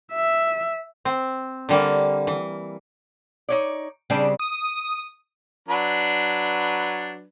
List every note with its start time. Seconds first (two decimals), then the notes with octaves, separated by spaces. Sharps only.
0.13 E5
1.05 C4
1.69 D3 G3 A#3
2.27 E3
3.49 D#4 C#5 D5
4.10 C#3 G3 C4 D4 G5
4.39 D#6
5.68 F#3 D4 B4